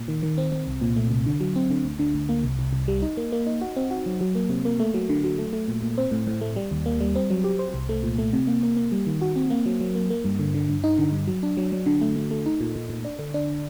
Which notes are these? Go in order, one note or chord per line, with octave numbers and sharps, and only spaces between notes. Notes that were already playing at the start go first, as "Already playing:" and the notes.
Already playing: A#2
D#3
D#3
C4
C4
C2
A#2
A3
C2
D3
F#3
C4
D3
D2
D3
D2
A#3
C2
C2
C2
G3
D#4
A#3
A#3
D#4
F#4
C4
F#4
F#3
F#3
A#3
C3
A#3
A3
F#3
D3
F#3
A3
A3
A#2
A#2
C4
A2
A2
A3
G3
D#2
A#3
G3
C4
F#3
G4
C5
C2
A3
A#2
A3
C3
A#3
A#3
A#3
G3
D#3
F#4
C4
A#3
F#3
F#3
A#3
A#3
G2
D3
D3
G2
D#4
D3
G2
F#3
D4
F#3
F#3
D3
A3
A3
A3
D#4
A#2
A#2
A#2
D4
D3
D4